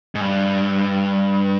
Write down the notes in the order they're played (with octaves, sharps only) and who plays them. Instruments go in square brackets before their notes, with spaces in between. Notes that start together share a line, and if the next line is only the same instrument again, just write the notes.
[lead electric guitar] G#2
G2